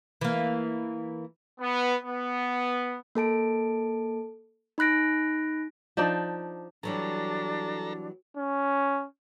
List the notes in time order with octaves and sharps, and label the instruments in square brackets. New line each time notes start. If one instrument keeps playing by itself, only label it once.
[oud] E3 A#3
[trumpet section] B3
B3
[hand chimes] A#3 A4 A5 D7
D#4 B5 F#6 A#6 D7
[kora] F3 D4 D#4 D5
[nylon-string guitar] E3 F#3 G3 [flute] D4 [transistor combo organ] A4 A#5
[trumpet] C#4